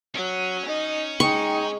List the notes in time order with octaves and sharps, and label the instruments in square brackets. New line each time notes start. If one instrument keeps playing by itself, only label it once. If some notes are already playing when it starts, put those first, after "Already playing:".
[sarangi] F#3 [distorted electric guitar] C#4
[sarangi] D#4
[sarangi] G#3 [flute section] D#4 G5 [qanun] C#6